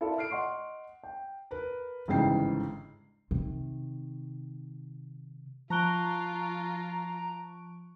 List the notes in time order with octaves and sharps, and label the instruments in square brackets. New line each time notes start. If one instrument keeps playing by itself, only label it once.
[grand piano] E4 F4 A4 A#4 D5 E5
F6 C7 D7
D#5 F#5 C6 C#6
G5
[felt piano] A#4 B4
G1 G#2 C#3 E3 G5 C7
[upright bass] C3 D#3
[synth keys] F3 C#6 D7 [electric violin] F4 [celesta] A5 F#6 G7 [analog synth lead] A#5